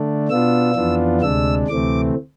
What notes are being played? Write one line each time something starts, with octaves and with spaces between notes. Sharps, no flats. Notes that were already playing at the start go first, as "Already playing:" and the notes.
Already playing: D3 A3 D4
B2 B3 D4 F4 E6
F2 E3 B3 D4 F4
D2 C3 G#3 D4 E6
D2 C3 E3 A3 C4 D6